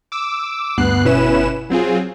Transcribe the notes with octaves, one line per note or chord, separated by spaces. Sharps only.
D6 E6
D2 G2 B3 F#6 C7
G1 B2 C#4 E4 B4 E7
F#3 C4 F4 G#4